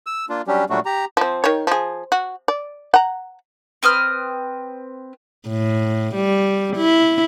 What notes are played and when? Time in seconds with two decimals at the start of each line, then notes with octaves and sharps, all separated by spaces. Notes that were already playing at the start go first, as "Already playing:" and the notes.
0.07 E6
0.29 A#3 D4 F4
0.47 F#3 G3 C#4 D4 G4
0.70 A#2 F#3 G3 A3 D4 F#4
0.86 G4 A#5
1.17 F3 C4
1.44 D#3 C#5
1.67 F3 G#4
2.12 F#4
2.48 D5
2.94 F#5 A#5
3.83 C4 B4 D#6 F6
5.49 A2
6.15 G3
6.76 E4